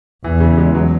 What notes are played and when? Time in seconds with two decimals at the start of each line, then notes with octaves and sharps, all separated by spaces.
0.24 E2 E3
0.40 C#3
0.58 G#3
0.75 F#3